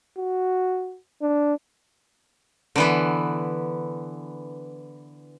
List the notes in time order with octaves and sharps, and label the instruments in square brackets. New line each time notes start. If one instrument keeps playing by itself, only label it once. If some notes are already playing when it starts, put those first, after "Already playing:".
[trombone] F#4
D4
[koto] D3 E3 B3